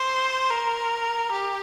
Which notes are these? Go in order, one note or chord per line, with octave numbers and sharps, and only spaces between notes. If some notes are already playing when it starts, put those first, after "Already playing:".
Already playing: C5
A#4
G4